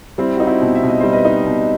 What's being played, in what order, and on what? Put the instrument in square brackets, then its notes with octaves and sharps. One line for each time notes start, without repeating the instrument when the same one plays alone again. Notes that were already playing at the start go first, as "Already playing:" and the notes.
[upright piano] G3 [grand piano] C4 E4
[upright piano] D#4 [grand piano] F#4
[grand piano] C4 E4
[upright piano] B2
[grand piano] E5
[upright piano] B2 [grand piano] D#5
[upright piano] G3 [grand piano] C5
[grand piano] B4 D#5
[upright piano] D#4
B2